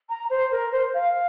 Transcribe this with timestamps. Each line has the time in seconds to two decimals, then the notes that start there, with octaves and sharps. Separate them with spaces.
0.09 A#5
0.30 C5
0.51 A#4
0.72 C5
0.94 F5